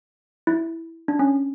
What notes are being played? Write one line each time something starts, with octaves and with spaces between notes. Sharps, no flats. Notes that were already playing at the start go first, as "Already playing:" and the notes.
E4
D4
C#4